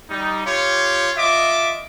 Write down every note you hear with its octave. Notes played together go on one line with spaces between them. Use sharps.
G3 D#4
F4 G4 C#5
F4 D#5 E5 D6